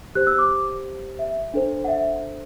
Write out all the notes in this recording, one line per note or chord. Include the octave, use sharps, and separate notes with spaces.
G4 C5 F#6
E6
D6
E5
D4 A4 C5
F#5
E5